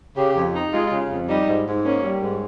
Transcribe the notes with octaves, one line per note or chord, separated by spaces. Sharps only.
C#3 G4
F2
D#4
G#3 F4
C#3
F2
G3 D#4
G#2
G#2
A#3 C#4
G3
G#2